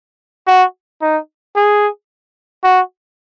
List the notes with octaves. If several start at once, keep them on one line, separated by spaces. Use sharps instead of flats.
F#4
D#4
G#4
F#4